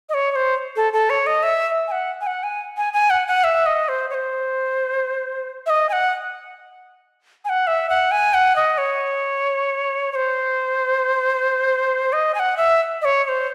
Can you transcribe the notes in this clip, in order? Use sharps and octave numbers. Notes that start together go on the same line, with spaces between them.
D#5
C#5
C#5
C5
A4
A4
C#5
D#5
E5
G#5
F#5
G#5
F#5
G#5
G#5
G#5
F#5
F#5
E5
D#5
C5
C#5
C5
E5
D#5
G#5
F#5
G#5
F#5
E5
F#5
G#5
F#5
D#5
C#5
C#5
C5
D#5
G#5
F#5
E5
D#5
C#5
C#5
C5